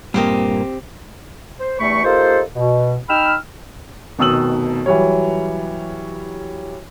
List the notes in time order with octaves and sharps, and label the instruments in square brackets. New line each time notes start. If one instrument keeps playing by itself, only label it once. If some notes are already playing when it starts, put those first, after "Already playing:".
[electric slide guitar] G2 A#2 A#3 [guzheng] C4 G4 D#5
[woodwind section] C5
E2 G2 A3 B5 C#6
A#3 D#4 F4 G4 A4 C5
B2
D#4 G5 B5 E6 F6
[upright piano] F1 B2 D#3 D#6 E6 F#7
E3 F#3 G3 C#5